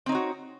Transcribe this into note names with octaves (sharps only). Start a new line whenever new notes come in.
C4 D#4 F#4 C#5